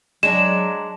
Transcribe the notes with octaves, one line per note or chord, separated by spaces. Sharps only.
F#3 G#3 D4 E7